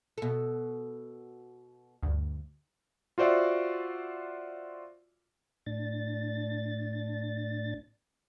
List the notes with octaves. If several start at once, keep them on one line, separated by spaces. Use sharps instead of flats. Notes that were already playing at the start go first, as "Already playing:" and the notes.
B2 A4
D2 G2
F4 F#4 C5 D5 E5 F#5
A2 D4 A6